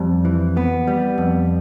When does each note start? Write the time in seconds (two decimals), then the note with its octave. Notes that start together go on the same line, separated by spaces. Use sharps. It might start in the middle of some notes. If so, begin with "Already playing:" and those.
Already playing: F2 G3
0.25 E3
0.57 B3
0.87 G3
1.18 F2